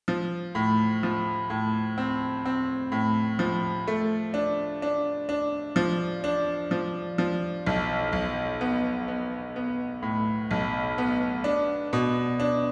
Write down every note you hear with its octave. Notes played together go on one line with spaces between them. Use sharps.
F3
A2
F3
A2
C4
C4
A2
F3
A3
D4
D4
D4
F3
D4
F3
F3
B1
B1
B3
B3
B3
A2
B1
B3
D4
B2
D4